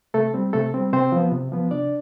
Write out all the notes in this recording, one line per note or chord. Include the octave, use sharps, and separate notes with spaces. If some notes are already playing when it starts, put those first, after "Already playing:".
C3 A3 A4
G3 C4
C3 A3 A4
G3 C4
C3 C4 C5
F3 B3
C3
F3 B3
C3 D4 D5